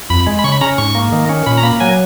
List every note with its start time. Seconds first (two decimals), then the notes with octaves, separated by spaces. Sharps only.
0.10 F2 B5
0.27 G#3
0.39 B5
0.44 C#3 C#6
0.52 B5
0.61 C#4 A#5
0.78 G#2 C#6
0.95 A#3
1.12 D#3
1.29 C#4
1.46 A#2 B5
1.57 A#5
1.63 A#3 B5
1.80 F#3 G#5